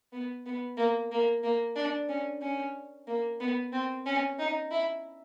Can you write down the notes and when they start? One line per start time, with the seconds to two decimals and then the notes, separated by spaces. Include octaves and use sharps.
0.13 B3
0.46 B3
0.78 A#3
1.12 A#3
1.43 A#3
1.76 D4
2.09 C#4
2.42 C#4
3.08 A#3
3.40 B3
3.73 C4
4.07 C#4
4.39 D#4
4.71 E4